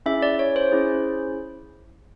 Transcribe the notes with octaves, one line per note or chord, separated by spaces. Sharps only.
C#4 E4 G#4 E5
D5
C#5
C5
C#4 E4 G#4